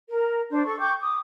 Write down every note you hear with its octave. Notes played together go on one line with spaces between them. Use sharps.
A#4
D4 C5
A4 C#6
G5 C#6 D6 G6
D6 D#6